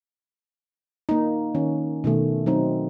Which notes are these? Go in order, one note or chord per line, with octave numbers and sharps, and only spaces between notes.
A#3 D#4
D#3 C#4
B2 D#3 A3
F#3 C4 D#4